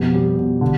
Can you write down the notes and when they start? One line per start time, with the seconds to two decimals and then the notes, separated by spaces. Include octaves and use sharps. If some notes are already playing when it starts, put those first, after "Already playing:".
Already playing: F2 B2 G4
0.14 G3
0.38 B2
0.61 D3